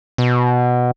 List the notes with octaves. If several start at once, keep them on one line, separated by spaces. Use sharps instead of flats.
B2